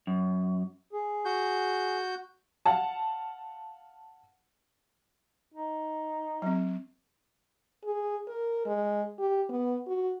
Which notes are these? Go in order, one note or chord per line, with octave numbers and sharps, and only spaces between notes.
F#2
G#4
F#4 G6
F5 F#5 A5
D#4
F#3 C4
G#4
A#4
G#3
G4
B3
F#4